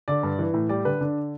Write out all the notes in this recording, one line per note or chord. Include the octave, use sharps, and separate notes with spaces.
D3 D5
G2
E3
A2
G3 D5
D3 B4
D3 D4